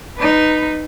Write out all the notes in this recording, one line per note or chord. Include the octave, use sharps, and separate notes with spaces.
D#4 B4